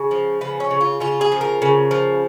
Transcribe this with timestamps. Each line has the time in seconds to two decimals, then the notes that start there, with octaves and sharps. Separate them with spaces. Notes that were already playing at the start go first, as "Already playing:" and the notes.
Already playing: C#3
0.11 F3
0.41 C#3 B3
0.60 C#4
0.71 C#3
0.81 F4
1.00 C#3 F4
1.21 G#4
1.32 F3
1.41 A#4
1.62 C#3
1.91 F3